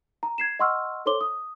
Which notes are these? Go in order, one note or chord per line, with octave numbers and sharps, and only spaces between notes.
A#5
G#6 C7 E7
D#5 F#5 C6 C#6 E6 F6
A4 C5 C#5 C6 D6 G7
D#6